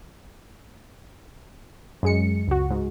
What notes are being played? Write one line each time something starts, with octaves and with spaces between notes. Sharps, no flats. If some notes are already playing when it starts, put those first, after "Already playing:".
F#2 G#3 C#7
C#2 F#4
G#2